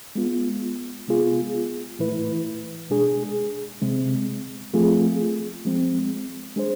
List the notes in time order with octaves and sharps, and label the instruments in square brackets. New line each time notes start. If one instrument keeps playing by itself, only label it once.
[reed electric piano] G#3 B3 F4
C3 G#3 B3 F4 G#4
A2 E3 A3 E4 B4
B2 G#3 D4 G#4
C3 G#3 C4
F3 A3 C4 F4 G#4
F3 G#3 C4
G#3 D4 G#4 C5